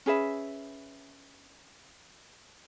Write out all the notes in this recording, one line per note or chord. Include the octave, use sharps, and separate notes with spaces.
C#4 G#4 B4 E5